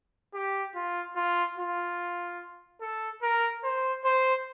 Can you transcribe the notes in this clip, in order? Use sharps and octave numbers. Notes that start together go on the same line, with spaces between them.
G4
F4
F4
F4
A4
A#4
C5
C5